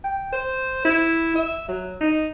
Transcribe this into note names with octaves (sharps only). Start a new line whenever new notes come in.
G5
C5
E4
E5
F#3
D#4